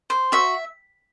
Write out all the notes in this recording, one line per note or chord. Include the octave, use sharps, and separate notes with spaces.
C5
F#4 E5